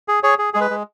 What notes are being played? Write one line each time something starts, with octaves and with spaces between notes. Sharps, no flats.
G#4
G#4 C#5
G#4
G#3 G#4
B4
G#3